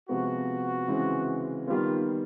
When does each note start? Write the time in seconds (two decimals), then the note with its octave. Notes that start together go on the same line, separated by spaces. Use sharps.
0.09 C3 F3 G#3 B3 F#4
0.88 C#3 E3 G#3 C4
1.68 D#3 G3 B3 F4